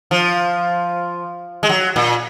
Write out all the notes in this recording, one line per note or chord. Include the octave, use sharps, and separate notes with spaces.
F3
G#3
F#3
A#2